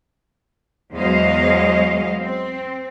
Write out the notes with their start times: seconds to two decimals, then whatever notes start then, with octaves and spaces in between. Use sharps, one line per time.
0.94 E2 F#3 G#3 C5 D#5 F5
2.19 C4